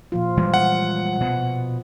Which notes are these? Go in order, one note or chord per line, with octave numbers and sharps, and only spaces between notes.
A#2 F3 F4
E3 G3 G#3
F#5
B2